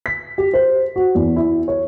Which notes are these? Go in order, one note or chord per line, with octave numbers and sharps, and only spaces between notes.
B6
G4
C5
F#4
E2
E4
C#5